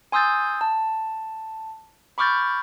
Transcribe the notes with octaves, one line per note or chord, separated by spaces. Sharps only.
G#5 C6 D#6 E6 G6 A6
A5
B5 C#6 D6 F6 G6 A6